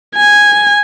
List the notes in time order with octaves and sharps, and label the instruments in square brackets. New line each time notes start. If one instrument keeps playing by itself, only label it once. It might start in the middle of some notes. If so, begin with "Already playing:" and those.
[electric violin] G#5